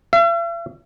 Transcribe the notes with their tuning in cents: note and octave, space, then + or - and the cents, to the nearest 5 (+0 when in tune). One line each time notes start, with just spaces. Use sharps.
E5 +45